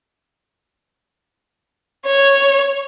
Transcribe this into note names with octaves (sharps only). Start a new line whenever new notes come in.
C#5